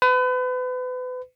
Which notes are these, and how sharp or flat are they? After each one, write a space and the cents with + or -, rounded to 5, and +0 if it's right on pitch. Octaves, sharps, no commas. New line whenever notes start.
B4 +35